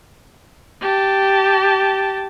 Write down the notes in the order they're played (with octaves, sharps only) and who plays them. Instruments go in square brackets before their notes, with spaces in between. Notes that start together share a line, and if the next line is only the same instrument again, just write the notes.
[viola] G4 A5